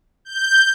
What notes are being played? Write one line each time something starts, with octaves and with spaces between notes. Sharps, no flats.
G6